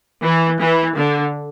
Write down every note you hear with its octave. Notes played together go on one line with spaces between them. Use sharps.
E3
E3
D3